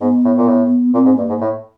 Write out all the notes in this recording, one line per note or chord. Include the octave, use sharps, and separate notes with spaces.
G#2 B3
A2
A#2
A2
A#2 C4
G#2
G2 A#3
G#2
A2